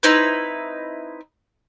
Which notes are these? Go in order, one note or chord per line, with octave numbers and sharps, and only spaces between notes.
C4 D#4 E4 B4